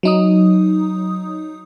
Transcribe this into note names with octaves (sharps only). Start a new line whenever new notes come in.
F#3 D#4 D#6